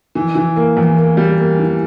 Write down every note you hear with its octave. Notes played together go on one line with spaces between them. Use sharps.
E3
E3
A#3
E2
A#3
G3
A#3
E3